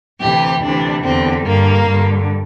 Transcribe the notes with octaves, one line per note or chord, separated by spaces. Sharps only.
D2 C3 E3 G4
D2 C3 E3 D4
E2 D3 C4
G2 D3 A#3
G2 D3